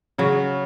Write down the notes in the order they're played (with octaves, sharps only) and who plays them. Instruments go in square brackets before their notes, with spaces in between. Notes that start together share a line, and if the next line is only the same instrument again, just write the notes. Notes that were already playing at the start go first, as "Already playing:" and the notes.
[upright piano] C#3 [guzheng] F#3